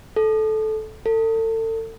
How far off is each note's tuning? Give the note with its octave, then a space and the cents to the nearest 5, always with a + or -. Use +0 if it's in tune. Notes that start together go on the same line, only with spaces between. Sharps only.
A4 -15
A4 +35